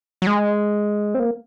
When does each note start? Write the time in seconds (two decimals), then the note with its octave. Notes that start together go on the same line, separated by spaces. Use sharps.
0.22 F#3
0.27 G#3
1.14 C4
1.19 A#3